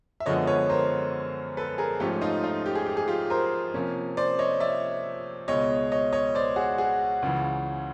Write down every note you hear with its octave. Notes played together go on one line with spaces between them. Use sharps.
E5
F#2 D3 F3 G#3 B3 C#5 D#5
B4 C#5
A#4 C5
A4 B4
G#4 A#4
G#2 F3 A3 C#4 G4 A4
D#4 F4
D#4 F4
G4
G#4
G4
G#4
F4 G4
A#4 C5
C3 F3 A#3 C#4
C5 D5
C#5 D#5
D5 E5
C#2 B2 G#3 C#5 D#5
C#5 D#5
C#5 D#5
C5 D5
F#4 G#4
F#4 G#4
C#2 C#3 E3